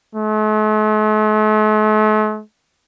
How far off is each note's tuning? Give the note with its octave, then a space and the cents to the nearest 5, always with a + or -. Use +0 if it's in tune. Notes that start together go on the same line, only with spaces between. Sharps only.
A3 -45